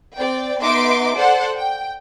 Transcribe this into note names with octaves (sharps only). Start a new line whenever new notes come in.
C4 D5 G5
B3 D#4 E5 C6 D6 D7
A4 C5 D5 F#5
G5